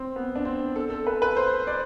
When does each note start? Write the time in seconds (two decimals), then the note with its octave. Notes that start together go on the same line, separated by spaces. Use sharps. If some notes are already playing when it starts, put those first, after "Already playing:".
Already playing: C4
0.16 B3
0.36 D4
0.45 C4
0.76 A4
0.90 A4
1.07 B4
1.22 B4
1.36 C5
1.67 D5